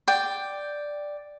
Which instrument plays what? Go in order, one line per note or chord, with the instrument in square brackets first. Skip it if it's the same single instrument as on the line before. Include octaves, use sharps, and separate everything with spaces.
[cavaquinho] D5 G5